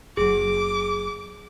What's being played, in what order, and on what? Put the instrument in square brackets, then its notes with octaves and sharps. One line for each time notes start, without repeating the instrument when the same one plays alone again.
[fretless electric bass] F#1 F#3 [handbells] G#4 [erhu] D6